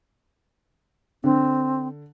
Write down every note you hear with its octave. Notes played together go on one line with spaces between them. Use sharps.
D3 C4